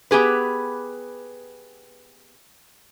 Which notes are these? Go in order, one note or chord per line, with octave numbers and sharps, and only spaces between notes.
B3 G4 G#4 B4